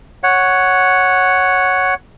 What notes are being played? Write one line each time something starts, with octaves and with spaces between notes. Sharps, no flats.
C#5 F#5